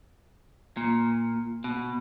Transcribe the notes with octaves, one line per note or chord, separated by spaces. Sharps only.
A#2
B2